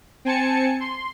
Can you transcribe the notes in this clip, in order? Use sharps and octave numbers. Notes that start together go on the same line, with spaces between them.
C4 G#5 A5 C#7
C6